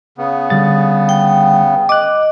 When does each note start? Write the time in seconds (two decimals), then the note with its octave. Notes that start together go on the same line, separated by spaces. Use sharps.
0.18 C#3 B3
0.50 D3 G3 A6
1.09 G5
1.89 D#5 D6 F#6